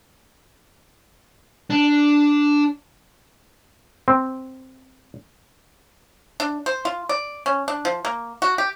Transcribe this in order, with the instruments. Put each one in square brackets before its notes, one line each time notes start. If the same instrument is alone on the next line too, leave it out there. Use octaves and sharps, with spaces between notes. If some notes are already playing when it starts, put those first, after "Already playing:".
[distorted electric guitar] D4
[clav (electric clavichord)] C4
[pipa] D4
C5
F4
D5
C#4
D4
F3
A#3
F#4
G4